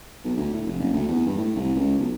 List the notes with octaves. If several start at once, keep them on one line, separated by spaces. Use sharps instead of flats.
B1
D2
A2
F1
F#1
D2
E2
G2
A2
C2
C#2
B1